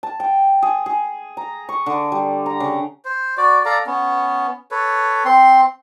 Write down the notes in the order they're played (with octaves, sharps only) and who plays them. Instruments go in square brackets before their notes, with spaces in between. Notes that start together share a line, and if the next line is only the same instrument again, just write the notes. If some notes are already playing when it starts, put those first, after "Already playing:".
[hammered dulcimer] A5
G5
G#4
G#4
A#5
C#6
D3
G3
A#5
C#3
[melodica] C5
F#4 D5
A4 D5 F5 A#5
B3 C#4
A4 B4 C#5
C4 C6